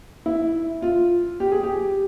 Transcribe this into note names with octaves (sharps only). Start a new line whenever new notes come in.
E4
F4
G4
G#4
G4